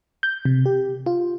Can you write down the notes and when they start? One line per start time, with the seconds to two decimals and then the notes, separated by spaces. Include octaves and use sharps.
0.23 G6
0.45 C3
0.66 G4
1.06 F4